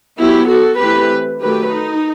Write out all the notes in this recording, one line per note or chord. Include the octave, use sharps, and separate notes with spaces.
F#3 B3 E4 G4
F#4 A4
E3 A3 C4 G4 B4
D#3 F#3 A3 G4 B4
D#4